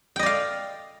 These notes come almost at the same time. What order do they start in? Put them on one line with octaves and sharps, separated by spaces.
G5 D#5 D5 F5